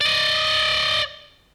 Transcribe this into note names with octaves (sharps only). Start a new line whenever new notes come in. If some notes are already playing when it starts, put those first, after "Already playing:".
D5 D#5